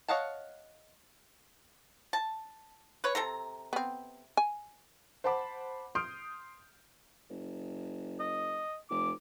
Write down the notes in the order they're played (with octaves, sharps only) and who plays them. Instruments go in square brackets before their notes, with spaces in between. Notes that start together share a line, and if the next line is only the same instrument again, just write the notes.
[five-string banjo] C#5 D#5 F5 F#5 A5
[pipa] A5
B4 C#5
C3 A4 A#5
[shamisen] B3 C4
G#5
[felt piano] C5 F#5 A5 B5 D6
C6 D#6 F6 G6 D7
[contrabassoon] F#1
[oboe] D#5
[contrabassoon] F1 [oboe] D6